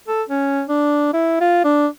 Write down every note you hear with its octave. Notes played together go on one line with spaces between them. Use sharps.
A4
C#4
D4
E4
F4
D4